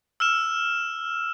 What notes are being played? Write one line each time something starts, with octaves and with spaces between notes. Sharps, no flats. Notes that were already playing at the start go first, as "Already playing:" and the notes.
E6 F6 E7